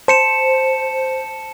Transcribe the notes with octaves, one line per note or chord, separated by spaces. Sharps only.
C5 A5 C#7 E7